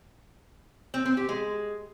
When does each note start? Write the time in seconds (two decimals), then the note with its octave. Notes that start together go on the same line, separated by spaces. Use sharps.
0.94 C4
1.05 C4
1.17 G4
1.29 G#3